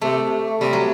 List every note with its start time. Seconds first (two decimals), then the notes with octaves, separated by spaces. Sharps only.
0.01 C3 A3
0.61 C3 G3
0.73 F#3